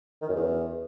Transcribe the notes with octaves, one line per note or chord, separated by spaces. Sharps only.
D#3
F#2
E2